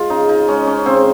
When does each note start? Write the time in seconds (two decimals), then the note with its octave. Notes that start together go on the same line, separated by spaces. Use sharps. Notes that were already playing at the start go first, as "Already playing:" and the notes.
Already playing: G#3 F4
0.10 C#3 D#4
0.29 D#4
0.48 G#3 C#4
0.67 C#4
0.86 C#3 C4